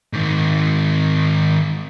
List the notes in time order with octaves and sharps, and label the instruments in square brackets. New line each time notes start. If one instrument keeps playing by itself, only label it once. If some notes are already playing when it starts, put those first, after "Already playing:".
[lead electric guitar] G#2 D#3